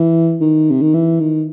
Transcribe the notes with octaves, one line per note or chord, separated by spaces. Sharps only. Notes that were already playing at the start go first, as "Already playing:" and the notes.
Already playing: E3
D#3
C3
D#3
E3
D#3